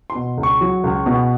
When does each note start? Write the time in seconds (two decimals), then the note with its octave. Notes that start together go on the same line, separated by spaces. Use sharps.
0.10 C6
0.15 B2
0.37 C#2
0.43 C#6
0.61 F#3
0.84 C#2
1.06 B2